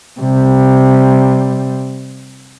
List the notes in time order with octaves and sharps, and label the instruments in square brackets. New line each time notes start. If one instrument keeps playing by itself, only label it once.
[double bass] C3 G3